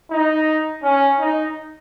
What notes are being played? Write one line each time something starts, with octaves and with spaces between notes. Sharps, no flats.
D#4
C#4
D#4